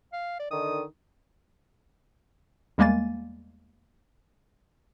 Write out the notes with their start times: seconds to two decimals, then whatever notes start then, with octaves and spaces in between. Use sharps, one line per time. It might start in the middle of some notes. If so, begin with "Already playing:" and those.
0.13 F5
0.40 D5
0.51 D3 D#3 D#6
2.78 E2 G3 G#3 A#3 G#5 A6